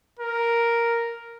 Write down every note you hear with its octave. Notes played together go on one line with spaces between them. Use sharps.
A#4